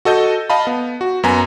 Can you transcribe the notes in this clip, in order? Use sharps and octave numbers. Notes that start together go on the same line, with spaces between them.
F#4 A4 D#5 G6
D#5 F5 A5 B5
B3
F#4
F#2 B3 G#5 A#5